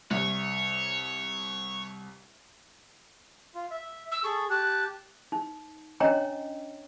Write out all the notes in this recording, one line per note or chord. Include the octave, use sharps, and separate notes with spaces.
C2 C#5
F4
E5
E6
G#4 A4 C#6
G4 A5 F#6
D#4
C#4 D4 C#5 D#5 G5 A#5